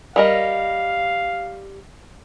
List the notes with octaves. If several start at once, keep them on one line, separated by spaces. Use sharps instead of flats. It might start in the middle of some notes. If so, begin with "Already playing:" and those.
G3 A#4 D#5 F5